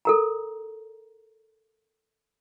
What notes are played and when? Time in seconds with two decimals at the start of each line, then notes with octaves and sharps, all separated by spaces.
0.05 A4 A#4 A#5